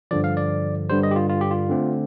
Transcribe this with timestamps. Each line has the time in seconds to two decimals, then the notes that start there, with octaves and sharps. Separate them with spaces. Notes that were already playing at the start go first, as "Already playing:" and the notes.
0.11 G2 D3 F3 D5
0.24 F5
0.37 D5
0.90 G2 D3 G3 C5
1.03 D#5
1.11 G4
1.16 F4
1.29 F4
1.41 G4
1.51 F4
1.70 D3 A3 C4